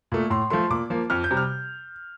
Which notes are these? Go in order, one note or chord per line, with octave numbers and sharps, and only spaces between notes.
A#2 A3
A2 C6
F3 A3 C6
A#2 D6
F3 A#3
F2 F6
G6
C3 G3
F6